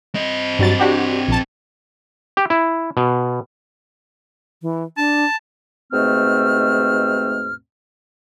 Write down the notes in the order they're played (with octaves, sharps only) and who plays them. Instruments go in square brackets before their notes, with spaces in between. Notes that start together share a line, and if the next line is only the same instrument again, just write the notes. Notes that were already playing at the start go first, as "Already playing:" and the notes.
[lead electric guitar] C4 D#5
[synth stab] G2 F#3 A6
D4 F#4 G4
A#1 A5
[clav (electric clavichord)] G4
E4
B2
[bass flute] E3
[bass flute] D4 [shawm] A5
[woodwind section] D#2 G#2 B2 A3 C4 F6